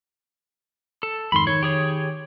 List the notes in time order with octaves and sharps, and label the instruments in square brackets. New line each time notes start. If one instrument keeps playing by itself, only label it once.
[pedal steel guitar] A4
[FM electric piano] F2 G#2 D#3 [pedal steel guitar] B5 C6
[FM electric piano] D#3 [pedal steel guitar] C#5
[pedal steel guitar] G4 G#4 C#5